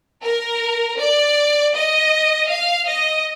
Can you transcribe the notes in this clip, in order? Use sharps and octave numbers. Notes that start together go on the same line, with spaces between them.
A#4
D5
D#5
F5
D#5